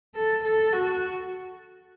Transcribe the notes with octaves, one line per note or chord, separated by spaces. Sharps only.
A4
A4
F#4